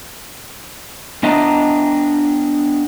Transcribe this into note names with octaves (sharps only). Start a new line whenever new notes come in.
B3 D4 D#5 E5 A5 A#5